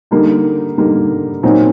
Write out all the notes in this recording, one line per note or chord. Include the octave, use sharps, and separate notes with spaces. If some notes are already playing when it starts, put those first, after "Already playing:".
D3 G3 A#3 D#4
D3 G3 A#3 D#4
A#2 F#3 C4 D#4